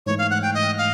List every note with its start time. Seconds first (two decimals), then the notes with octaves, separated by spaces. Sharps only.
0.06 G#2 E3 A3 C#5
0.18 F5
0.30 F#5
0.42 G5
0.54 D#5
0.78 F5